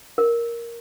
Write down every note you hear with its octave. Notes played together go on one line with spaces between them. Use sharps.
A#4